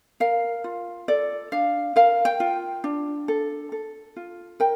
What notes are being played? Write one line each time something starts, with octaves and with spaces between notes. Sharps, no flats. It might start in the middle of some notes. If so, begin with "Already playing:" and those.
A#4 F5
F4
A4 D5
D4 F5
A#4 F5
G5
F4
D4
A4
A4
F4
A#4 G5